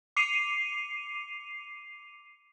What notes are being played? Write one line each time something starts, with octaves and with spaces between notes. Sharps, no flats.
D6 C7 C#7 D#7 F7